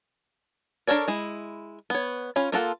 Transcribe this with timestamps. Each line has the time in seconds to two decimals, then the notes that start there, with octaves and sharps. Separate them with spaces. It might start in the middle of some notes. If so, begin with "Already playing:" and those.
0.87 D4 A4 A#4 C#5 D5
1.08 G#3 E4
1.90 B3 C#5
2.36 C#4 F4 B5
2.52 A#3 F4 A4 F#5